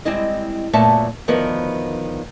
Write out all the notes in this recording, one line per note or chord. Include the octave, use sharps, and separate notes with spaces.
G3 G#3 C4 E4 D#5
F#2 A#2 A3 B3 E5 A5
D2 D#3 F3 B3 A#4 B4